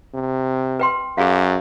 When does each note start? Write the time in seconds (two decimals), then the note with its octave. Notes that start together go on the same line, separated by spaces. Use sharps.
0.14 C3
0.79 B4 G5 C6
1.18 F#2 G#4 F5